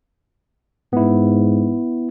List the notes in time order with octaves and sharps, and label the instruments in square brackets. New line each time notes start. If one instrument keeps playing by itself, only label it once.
[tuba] G#2 [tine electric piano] B3 E4